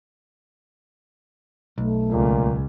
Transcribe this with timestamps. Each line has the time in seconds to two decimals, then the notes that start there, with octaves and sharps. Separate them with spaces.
1.78 B1 A3
2.11 C#2 A#2